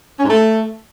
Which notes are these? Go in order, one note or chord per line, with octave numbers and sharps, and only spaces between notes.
C#4
G#2
A3